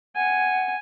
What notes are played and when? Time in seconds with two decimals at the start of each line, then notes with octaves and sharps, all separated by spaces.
0.16 F#5 G#5